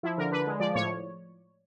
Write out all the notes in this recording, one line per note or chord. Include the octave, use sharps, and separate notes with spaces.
F3 E4
D3 A#4
D3 B4
G#3
F3 D5
A2 C#5